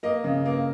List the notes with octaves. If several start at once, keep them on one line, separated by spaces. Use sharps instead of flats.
A#3 D#5
C#3
A#3